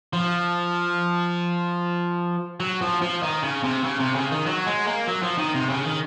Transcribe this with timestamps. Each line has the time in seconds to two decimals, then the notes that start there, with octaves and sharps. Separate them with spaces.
0.13 F3
2.60 F#3
2.81 F3
3.02 F3
3.23 D#3
3.42 C#3
3.63 C3
3.83 C#3
3.99 C3
4.14 C#3
4.31 D#3
4.46 F#3
4.66 G#3
4.87 A#3
5.08 F#3
5.23 F3
5.38 D#3
5.54 C3
5.69 C#3
5.85 D#3